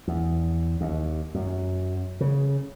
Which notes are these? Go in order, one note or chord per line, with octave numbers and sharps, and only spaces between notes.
E2
D#2
F#2
C#3